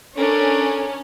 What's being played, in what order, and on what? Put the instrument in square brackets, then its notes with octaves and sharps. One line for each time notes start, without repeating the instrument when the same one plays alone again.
[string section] C#4 [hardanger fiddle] D4 A#4 [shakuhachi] A4